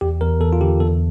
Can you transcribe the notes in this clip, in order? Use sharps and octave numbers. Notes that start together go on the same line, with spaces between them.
E2 G4
E2 A#4
E2 A4
F4
D3 G4
E2 A4